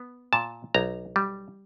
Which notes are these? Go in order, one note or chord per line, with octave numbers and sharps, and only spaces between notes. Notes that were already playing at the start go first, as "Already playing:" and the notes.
Already playing: B3
A#2 A5
B1 A#5
G3